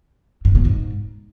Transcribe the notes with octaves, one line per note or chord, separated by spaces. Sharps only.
G2
B2
G#2